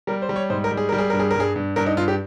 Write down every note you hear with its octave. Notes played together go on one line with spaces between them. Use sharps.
G3 A#4
C5
G3
C#5
G#2 C5
A#4
G3
G#4
G3 A#4
G#4
G2 A#4
G#4
G2 A#4
G#4
G2
G2 A#4
D#4
G2 F4
G4